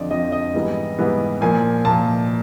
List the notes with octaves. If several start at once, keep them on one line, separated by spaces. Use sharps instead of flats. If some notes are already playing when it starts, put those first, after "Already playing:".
Already playing: F2 D3 F3 D5 D#5
F2 D3 F3 D#5
D#5
G#2 E3 G3 B3
G#2 E3 G3 B3
A#2 F3 A#3 G#5
A#2 F3 A#3 A5